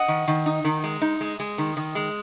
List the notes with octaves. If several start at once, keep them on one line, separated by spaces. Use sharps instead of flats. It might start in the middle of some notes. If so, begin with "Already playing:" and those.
Already playing: D#5 F#5
D#3
D#3
D#4
D#3
G#3
D#4
G#3
G#3
D#3
D#3
G#3